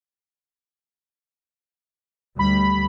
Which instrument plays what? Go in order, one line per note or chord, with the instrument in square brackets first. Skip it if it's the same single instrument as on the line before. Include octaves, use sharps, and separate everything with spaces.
[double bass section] D2 G3 [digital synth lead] B5